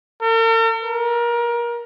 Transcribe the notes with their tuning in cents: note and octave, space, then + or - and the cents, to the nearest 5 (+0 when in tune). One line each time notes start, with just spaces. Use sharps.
A#4 -45
A#4 +25